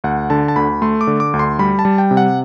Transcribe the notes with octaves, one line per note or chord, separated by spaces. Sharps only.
D2 F#5
D3 A5
A5
D2 B5
A3 C6
D6
D3
D6
D2
C6
G3 B5
A5
G3
G5
C3
F#5